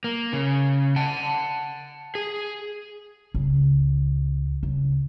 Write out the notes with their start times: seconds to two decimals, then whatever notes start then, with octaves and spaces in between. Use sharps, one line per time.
0.04 A#3
0.33 C#3
0.96 F#5 A5
2.15 G#4
3.34 C#2
4.63 C#2